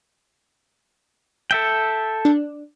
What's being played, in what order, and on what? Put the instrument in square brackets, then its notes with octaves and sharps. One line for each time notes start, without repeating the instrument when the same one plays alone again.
[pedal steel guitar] A4 E5 G5
[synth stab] D4